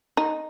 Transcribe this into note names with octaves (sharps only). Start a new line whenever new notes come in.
D#4